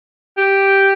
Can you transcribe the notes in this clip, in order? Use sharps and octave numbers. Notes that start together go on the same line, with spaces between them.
G4